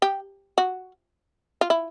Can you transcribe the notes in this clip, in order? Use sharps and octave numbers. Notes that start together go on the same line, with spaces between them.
G4
F#4
F4
E4